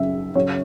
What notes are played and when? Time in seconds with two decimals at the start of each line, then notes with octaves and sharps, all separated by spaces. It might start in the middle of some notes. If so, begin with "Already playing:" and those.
Already playing: F#2 C#3 F#3 E5
0.35 F#2 C#3 F#3 C#5